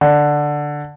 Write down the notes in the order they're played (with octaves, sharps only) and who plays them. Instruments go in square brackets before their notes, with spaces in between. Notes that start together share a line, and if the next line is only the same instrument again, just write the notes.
[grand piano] D3